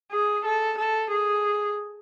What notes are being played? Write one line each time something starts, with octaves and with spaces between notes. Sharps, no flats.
G#4
A4
A4
G#4